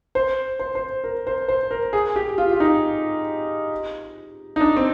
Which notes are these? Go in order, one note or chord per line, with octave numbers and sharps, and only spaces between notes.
C5
C5
C5
A#4
C5
C5
A#4
G#4
G4
F4
F4
D#4
D#4
D4
C4